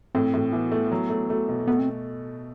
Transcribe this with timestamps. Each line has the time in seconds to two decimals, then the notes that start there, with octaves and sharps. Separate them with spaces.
0.15 A2 C4
0.34 A2
0.53 E3 B3
0.72 A3
0.92 F#3
1.10 A3
1.30 A3
1.49 B2
1.67 A3 B3
1.79 C4